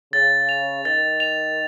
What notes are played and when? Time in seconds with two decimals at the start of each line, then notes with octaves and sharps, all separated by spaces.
0.13 C#3 A6
0.49 F7
0.85 D#3 A6
1.20 F7